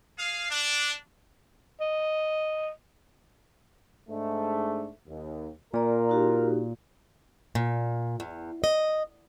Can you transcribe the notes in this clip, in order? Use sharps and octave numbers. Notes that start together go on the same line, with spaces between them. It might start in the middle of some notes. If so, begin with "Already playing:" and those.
G#4 F5
D4
D#5
G#2 A3 D4
D#2
A#2 F4 A#4 D5 A#5
D#4 F#4 G4
A#2
E2
D#5